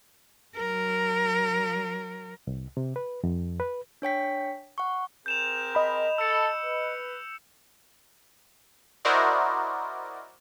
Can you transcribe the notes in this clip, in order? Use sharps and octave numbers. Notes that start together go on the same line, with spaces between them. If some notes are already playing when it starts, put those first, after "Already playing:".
F#3 A#4
C2
C3
B4
F2
B4
D4 C#5 G5 B6
F#5 C#6
C4 G#4 A#4 G6 E7 F7
D#5 B5
A4 E6 C#7
B4
E4 F#4 A#4 C5 D5 D#5